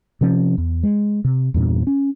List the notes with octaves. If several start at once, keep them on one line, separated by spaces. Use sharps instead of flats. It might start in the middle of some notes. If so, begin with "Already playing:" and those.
C3 F3 C#4
E2
G#3
C3
E2 G2 A#2
C#4